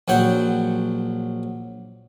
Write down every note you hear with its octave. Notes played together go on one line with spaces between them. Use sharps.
A#1 F#3 F#5 G5